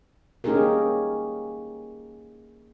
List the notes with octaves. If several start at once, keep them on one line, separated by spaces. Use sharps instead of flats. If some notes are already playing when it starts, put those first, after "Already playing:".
A#3 C#4 D#4 G4 G#4 A#4